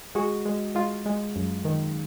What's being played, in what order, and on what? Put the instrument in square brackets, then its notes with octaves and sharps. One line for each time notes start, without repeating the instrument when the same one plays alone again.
[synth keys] G#3 F#4
G#3
G#3 F4
G#3
F#2
D#3